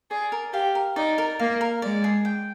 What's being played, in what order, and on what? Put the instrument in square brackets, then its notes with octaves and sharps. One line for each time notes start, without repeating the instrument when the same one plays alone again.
[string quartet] G#4 [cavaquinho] D5
[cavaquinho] A#4
[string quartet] G4 [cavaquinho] F5
[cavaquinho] A#4
[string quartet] D#4 [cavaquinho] D5
[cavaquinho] A#4
[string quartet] A#3 [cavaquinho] F5
[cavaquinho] A#4
[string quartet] G#3 [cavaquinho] D5
[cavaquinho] G#4
G5